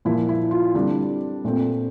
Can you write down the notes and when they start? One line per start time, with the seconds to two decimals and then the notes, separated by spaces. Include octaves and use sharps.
0.05 A#2 F3 A#3 E4
0.29 E4
0.51 F4
0.74 D3 G3 C4 D4
1.44 A#2 A3 C4